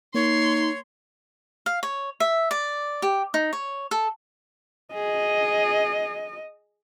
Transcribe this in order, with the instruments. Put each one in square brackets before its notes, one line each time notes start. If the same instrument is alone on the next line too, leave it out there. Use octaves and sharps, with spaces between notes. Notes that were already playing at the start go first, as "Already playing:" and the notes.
[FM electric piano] A#3 [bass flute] D#4 [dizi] C#5 [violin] C6
[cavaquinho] F5
C#5
E5
D5
G4
D#4
C#5
A4
[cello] G#4 [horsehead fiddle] D#5